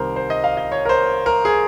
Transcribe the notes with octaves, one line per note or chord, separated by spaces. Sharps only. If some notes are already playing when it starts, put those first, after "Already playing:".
Already playing: C2 C3 D#3 A#4 C5
C5
D#5
F5
D#5
C#5
A#4
C5
A#4
G#4